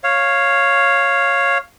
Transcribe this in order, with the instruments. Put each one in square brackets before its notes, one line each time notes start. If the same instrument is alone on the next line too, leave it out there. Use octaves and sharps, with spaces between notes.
[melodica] C#5 F5